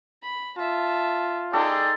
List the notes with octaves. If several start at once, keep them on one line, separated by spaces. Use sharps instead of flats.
B5
F4 E5 A5
D#4 G#4 A4 D5 G5 C6